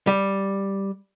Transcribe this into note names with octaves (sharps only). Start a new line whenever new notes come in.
G3